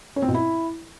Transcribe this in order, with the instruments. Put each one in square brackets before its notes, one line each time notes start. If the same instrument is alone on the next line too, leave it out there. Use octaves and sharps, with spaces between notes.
[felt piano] C#4
C4
B2
E4